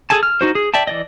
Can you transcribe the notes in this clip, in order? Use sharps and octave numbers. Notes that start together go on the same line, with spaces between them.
G#4 A4 G#5 A5
F6
D#4 F#4 C5
G#4
D5 E5 G5 A5
E3 D5 D#5